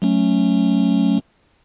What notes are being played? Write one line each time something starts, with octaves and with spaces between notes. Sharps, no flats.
F#3 A3 C#4